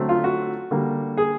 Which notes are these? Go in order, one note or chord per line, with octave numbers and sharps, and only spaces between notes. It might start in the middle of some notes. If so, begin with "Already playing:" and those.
Already playing: D3 F#3 A3 C4
F4
F#4
D3 G3 A#3
G#4